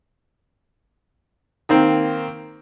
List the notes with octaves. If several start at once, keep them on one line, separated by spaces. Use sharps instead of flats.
D#3 A#3 C4